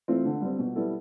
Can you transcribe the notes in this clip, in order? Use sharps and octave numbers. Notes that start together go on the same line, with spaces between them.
E3 A3 C4 F4
D3
G3 C4
B2
G3 B3 E4 A4